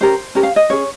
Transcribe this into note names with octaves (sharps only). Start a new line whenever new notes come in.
C#4 G4 A#4 C5
C#4 G4 A#4
F5
D#5
C#4 G#4 C#5